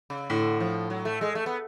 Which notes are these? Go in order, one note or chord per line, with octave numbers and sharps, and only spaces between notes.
C#3
A2 D3
F3
F#3
A3
G#3
A3
B3